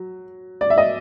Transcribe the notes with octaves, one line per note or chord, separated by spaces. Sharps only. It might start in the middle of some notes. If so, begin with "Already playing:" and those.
Already playing: F#3
D5
E5
D#5